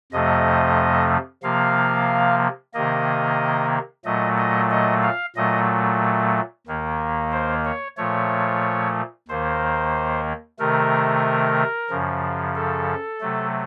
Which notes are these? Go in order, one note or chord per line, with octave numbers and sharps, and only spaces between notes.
F2 C3 F3 A3 D#5
C3 F3 A#3 F5
C3 D#3 A#3 D#5
A#2 F#3 A3 D#5
D#5
D#5
F5
A#2 F#3 A3 D#5
D#2 D#3 A#3
C5
C#5
A#2 F3 A3 C#5
D#2 D#3 A#3 C5
C3 D#3 A3 A#4
F#2 C#3 F3
A4
C3 F#3 A3